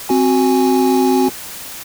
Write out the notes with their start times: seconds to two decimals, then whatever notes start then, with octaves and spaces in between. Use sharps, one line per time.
0.09 C4 F#4 G#5